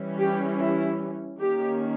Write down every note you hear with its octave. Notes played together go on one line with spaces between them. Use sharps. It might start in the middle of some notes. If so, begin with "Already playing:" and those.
Already playing: E3 G3 C#4
G4
E4
D#3 A#3 C#4 G4